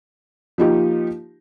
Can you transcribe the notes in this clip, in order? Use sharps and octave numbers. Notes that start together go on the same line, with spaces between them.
F3 A#3 D#4 F4 G4